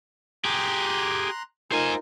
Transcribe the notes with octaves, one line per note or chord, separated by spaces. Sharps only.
G4 G#4 A#5 C6 F#6
D#4 F4 A#4 C5 G#5